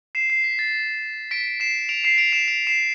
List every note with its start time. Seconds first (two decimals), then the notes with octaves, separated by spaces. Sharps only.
0.15 C7 E7
0.30 C7
0.44 B6
0.59 A6
1.31 B6 D7
1.60 C7 E7
1.89 D7 F7
2.04 C7 E7
2.18 D7 F7
2.33 C7 E7
2.48 D7 F7
2.67 C7 E7